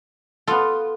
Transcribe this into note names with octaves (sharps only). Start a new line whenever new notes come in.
B3 F4 A4